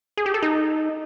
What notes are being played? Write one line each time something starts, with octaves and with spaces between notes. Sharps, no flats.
G#4
G4
A4
D#4